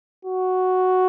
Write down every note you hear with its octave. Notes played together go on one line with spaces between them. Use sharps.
F#4